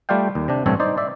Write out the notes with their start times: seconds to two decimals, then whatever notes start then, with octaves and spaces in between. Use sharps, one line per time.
0.09 G3 A3 F4 D5 F5 G5
0.35 D#2
0.48 C3 D4
0.66 A1 G2 C3 C4 A4 C#5
0.80 D#4 C5 D5
0.97 D5 E5